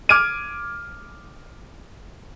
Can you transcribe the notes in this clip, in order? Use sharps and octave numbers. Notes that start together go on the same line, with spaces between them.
D6 F6 G#6 D7 D#7